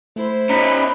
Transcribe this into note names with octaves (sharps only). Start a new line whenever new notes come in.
A3 E4 C5
C#4 D#4 A#5 B5 B6